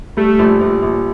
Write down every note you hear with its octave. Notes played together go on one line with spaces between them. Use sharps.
G3 A3
A#1
A#1
A#1